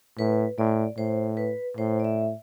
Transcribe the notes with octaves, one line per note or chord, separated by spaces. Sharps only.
A2 B4
A2 D5
A2 C5
B4
A2 C5
D5
E5